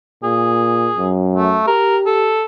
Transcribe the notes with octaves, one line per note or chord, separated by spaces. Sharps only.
A#2 G#4
F#2
A3
G4 A#4
A4